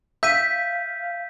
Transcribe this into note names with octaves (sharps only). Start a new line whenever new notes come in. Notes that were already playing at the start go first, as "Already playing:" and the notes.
E5 F5 G6 B6 D#7